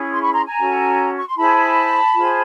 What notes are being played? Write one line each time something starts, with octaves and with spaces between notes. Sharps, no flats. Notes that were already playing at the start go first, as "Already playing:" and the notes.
Already playing: C#4 E4 G#4
C6
B5 C#6
A#5 C6
G#5 A#5
C#4 F#4 A4
C#6
C6
E4 G#4 C5 A5 B5
F4 G#4 C5